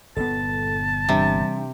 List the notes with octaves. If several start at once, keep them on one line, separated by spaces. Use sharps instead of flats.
G1 A#2 B3 A4 A5
C3 E3 G3 D4